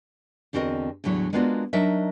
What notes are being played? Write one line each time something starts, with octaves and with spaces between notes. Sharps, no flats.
E2 D3 C4 F#4 A#4 D#5
E2 A2 D3 F#3 E4 C#5
G#3 A#3 B3 D4 F4 F#4
F#3 D4 D#4 A#4 D#5 E5